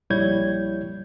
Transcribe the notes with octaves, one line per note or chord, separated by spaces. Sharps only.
A#1 G3 E4 C#5 G6 G#6